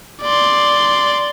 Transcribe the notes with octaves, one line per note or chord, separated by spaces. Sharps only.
D5 C6